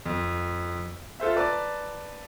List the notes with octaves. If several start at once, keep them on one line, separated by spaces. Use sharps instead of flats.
F2
F4 A4 C5 E5
B4 D5 A5 A#5